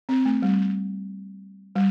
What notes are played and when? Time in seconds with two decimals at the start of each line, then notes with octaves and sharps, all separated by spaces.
0.09 C4
0.25 A3
0.42 G3
1.76 G3